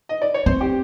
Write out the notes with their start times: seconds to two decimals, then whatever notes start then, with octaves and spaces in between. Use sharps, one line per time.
0.09 D#5
0.22 D5
0.34 C#5
0.46 C4 C5
0.61 G4